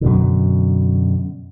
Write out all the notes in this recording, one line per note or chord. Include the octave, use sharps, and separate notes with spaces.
F#2 B2 D3